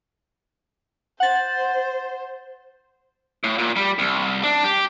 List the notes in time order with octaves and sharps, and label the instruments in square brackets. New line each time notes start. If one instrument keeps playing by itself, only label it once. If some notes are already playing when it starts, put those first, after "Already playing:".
[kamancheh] C5 [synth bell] F#5 A6
[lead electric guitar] A2
A#2
G3
C2
D4
G4